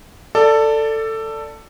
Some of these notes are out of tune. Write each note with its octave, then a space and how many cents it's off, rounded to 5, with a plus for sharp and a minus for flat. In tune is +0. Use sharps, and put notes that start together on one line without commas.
A4 +15 D5 +0